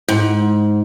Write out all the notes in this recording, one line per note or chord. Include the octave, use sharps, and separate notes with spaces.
G#2